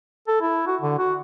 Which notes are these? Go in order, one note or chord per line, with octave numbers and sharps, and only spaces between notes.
A4
E4
F#4
D3
F#4